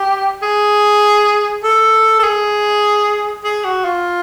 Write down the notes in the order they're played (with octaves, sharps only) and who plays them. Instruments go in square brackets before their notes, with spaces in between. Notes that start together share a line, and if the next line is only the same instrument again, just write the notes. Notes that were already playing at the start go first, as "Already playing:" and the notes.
Already playing: [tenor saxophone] G4
G#4
A4
A4
G#4
G#4
F#4
F4